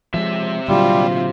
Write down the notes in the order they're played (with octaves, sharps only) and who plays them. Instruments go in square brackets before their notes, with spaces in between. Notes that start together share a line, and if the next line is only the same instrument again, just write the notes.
[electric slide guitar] C3 E5 [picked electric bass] F3 F#3 G#3
[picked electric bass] A#2 D3 F#3 [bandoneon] G3 [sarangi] F4